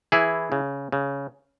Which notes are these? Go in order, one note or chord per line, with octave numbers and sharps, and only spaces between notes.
E3 E4 G#4
C#3
C#3